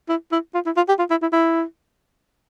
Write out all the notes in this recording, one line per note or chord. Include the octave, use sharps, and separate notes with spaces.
E4
E4
F4
E4
F4
G4
F4
E4
E4
E4